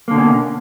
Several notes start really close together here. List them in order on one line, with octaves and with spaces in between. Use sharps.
A#3 D3 B2 C#4